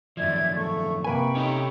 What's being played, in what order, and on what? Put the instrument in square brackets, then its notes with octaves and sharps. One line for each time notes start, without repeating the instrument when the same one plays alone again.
[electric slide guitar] F#2 D#3 F3 [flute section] D5 E5 G#6
[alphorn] A3 [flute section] C#6
[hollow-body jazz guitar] C3 B4 G#5 [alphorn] A#3 [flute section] G5 B5 C#6
[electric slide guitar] C#4 G4 A4 [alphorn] D#4